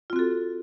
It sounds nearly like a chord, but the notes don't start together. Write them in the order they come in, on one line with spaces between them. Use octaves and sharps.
F4 C4 F#4 A4